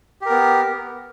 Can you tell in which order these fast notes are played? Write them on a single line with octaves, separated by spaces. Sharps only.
G4 A#4 B3